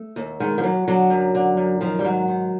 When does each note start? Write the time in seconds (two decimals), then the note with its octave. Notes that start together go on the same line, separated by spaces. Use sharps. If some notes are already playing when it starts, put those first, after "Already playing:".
Already playing: A3
0.16 D#2
0.40 D#3 G#3
0.58 F3
0.63 D#2 F#3
0.88 D3 F#3
1.10 F#2
1.35 D3
1.57 F#2
1.81 D#3 F3
1.99 G3
2.04 G#2 F#3
2.28 D#3